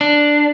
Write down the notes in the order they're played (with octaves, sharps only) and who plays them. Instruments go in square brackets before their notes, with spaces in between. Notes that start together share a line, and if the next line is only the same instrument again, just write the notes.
[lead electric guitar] D4